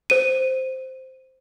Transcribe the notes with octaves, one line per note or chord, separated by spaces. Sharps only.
C5 D#7